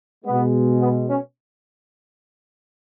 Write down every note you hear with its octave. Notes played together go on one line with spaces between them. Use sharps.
B2 G#3 B3
B3
C#4